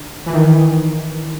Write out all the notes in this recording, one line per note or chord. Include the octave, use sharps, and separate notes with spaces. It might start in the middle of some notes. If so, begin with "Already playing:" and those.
Already playing: D3
E3
D#3